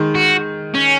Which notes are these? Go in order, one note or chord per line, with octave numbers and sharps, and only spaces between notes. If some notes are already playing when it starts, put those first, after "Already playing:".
Already playing: D#3 G#3
F#4
C#4